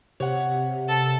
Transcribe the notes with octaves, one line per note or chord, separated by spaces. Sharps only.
C3 C#5 F#5
A4